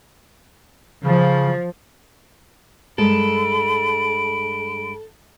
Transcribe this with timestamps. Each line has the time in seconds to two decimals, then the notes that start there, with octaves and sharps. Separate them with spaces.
1.04 C#3 F3
2.98 G2 G#3 A4 A#4 B5 D7